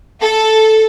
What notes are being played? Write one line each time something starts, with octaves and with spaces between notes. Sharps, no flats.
A4